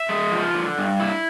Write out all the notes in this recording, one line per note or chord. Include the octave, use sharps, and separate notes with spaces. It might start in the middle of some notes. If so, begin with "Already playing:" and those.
Already playing: E5
G#3
F3
D3
G2
E4